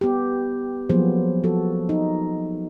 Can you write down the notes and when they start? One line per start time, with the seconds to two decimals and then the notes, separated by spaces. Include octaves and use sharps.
0.01 B3 G4
0.89 F3 F#3 A#3 B3 G#4 C5
1.44 F3 F#4 A4
1.89 D#4